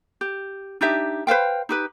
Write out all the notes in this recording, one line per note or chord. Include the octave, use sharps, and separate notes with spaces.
G4
D4 D#4 G4 E5
B4 C5 F5 G5
D#4 G4 B4